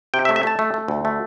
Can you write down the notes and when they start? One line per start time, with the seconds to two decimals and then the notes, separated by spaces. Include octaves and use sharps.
0.14 C3 G5
0.25 E5
0.29 A3
0.36 E5
0.43 A3 A5
0.59 A3
0.74 A3
0.88 D2
1.05 A3